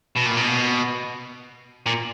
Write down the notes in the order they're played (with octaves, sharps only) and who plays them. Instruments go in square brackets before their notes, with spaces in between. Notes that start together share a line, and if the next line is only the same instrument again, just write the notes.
[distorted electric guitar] B2
A#2
B2
A#2